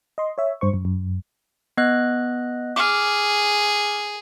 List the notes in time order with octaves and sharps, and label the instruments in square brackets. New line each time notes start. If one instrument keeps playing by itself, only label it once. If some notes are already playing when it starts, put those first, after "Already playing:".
[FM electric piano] D#5 C6
C#5 E5
G2 C5 C#6
F#2
F#2
[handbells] B3 D#5 F#6
[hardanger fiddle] G#4 [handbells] D6 F6